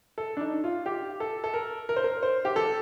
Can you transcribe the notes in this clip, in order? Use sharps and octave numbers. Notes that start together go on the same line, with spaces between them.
A4
D4
D#4
F4
G4
A4
A4
A#4
A#4
C5
A#4
C5
G4
A4